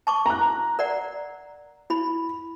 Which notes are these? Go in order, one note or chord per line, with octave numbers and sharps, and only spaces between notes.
A5 C#6 D6
A#5 F#6
A#4 D5 F#5
E4 B5